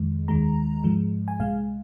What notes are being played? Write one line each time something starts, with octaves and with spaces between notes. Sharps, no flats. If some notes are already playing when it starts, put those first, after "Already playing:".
Already playing: F2 D#3 G#3
D#2 D#3 G#3 A#5
G#2 F3 G#3
G#5
C2 A#2 G#3 F5